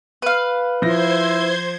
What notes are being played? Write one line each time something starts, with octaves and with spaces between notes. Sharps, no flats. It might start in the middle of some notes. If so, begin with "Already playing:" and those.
B4 F5
F3 E4 C5 C6 G#6 A#6